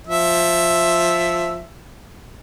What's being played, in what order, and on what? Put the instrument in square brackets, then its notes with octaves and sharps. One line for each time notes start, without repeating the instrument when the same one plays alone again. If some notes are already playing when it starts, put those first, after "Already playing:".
[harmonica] F3 E5